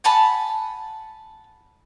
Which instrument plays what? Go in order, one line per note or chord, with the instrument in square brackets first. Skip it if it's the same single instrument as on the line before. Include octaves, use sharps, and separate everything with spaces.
[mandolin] F#5 G#5 A5 B5